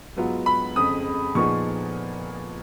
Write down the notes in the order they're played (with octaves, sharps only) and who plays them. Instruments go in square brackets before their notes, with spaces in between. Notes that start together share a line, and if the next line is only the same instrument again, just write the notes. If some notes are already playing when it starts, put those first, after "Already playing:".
[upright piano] G#2 F#3 B3 F4
[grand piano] B5
[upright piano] F2 C#3 G#3 [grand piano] D#6
[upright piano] A#2 F3 B3 D#4 G#4 [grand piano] C#6